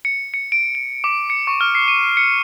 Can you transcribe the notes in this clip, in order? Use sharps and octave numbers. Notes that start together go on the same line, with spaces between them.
C#7
C#7
D7
D7
D6
C#7
C#6
F6
C7
D#7
C#7